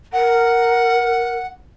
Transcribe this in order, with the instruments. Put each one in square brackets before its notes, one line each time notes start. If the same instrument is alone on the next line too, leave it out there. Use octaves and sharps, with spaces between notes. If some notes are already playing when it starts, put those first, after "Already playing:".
[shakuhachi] A#4 [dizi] F#5